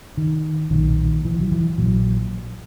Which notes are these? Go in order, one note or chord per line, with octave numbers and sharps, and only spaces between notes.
D#3
B1 A#2 D#3
E3
F#3
E3
A#1 A#2 F#3